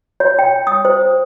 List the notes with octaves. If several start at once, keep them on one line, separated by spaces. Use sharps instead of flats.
C#5
G5
D#6
C5